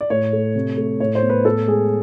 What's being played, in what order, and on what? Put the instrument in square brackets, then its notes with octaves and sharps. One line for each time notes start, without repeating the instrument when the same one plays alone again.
[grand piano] D5
A2 C#5
A3
C3
A3
A2 C#5
C5
B3
B4
A2 A4
G#3 G#4